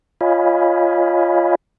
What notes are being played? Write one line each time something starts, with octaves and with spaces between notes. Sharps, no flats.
F4 C#5 D#5 F5 G#5 B5